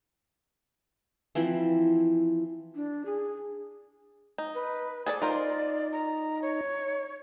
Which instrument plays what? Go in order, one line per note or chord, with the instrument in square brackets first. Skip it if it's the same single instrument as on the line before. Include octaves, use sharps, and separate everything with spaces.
[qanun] E3 F3 C4 E4
[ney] D4
G#4
[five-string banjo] D#4
[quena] B4
[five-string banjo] G#4 A4 D5 [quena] G#5
[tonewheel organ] D#4 [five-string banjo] F4 A#4 C5 [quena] D5
[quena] A#5
C#5